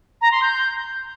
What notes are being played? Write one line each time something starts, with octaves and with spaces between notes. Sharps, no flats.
A#5
C6
G6